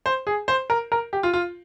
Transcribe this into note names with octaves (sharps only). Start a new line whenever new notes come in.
C5
G#4
C5
A#4
A#4
G4
F4
F4